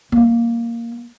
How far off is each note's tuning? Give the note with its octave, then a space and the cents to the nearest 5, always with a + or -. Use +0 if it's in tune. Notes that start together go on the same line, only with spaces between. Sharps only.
G3 +0 A#3 +0